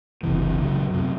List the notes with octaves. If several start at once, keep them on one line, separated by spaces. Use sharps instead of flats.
F#1 C#2 C3 E3
A#2 C#3 E3 F#3
F#2 C3